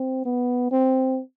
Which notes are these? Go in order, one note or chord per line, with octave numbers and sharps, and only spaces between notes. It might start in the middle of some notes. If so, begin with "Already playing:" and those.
Already playing: C4
B3
C4